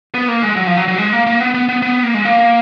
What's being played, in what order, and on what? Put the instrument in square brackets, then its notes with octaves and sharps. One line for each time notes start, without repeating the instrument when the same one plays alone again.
[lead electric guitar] B3
A#3
G#3
F#3
F3
F#3
F#3
G#3
A#3
A#3
B3
B3
B3
B3
A#3
G#3
A#3